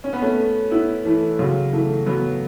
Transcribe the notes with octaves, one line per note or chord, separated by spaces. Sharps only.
C#4
B3
A3 C#4
B3 E4
E3 A3
C#3 F#3
E3 A3
F#3 B3